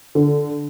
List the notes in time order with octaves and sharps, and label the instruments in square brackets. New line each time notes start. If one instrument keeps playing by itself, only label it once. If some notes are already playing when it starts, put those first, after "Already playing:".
[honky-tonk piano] D3